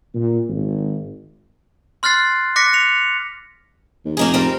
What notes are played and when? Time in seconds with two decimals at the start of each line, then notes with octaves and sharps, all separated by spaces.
0.14 A#2
0.48 G#1
2.03 C6 F6 F#6 A6 C7
2.56 D6 F#6 A#6 B6 C#7
2.73 C#7 F7
4.05 D#2
4.17 F1 A#3 D#4 G#4
4.34 G3 C4 A#4